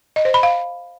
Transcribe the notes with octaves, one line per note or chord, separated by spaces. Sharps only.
D#5
C5
B5
F5